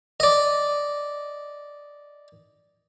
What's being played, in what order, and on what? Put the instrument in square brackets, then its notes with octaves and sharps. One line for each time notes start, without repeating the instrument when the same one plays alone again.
[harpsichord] D5 D#5